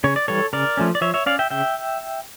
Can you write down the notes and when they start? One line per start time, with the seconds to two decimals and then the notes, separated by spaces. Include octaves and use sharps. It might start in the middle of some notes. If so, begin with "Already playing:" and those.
0.04 C#3 C#5
0.16 D5
0.28 E3 G3 A4 C#5
0.53 C#3 A#4 D5
0.77 F3 A3 C#4
0.95 D5
1.01 F3 C#5 E5
1.14 C#5 E5
1.26 C#4 D5 F5
1.39 E5 G5
1.50 C#3 E5 G5